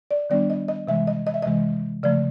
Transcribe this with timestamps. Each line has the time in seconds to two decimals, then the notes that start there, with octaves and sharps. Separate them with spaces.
0.11 D5
0.30 D#3 G3 B3 D4 D5
0.50 D#5
0.68 D#5
0.87 C3 E3 G#3 E5
1.07 D#5
1.27 D#5
1.34 E5
1.43 C3 E3 G#3 D#5
2.03 C#3 F3 A3 D5